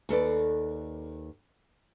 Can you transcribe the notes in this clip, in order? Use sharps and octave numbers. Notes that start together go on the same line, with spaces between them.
D#2 A4 B4 D5